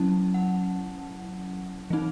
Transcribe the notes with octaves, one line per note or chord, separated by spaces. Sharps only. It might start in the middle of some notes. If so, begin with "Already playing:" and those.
Already playing: F#3 C#4 E4 A5
F#5
E3 C4 D#4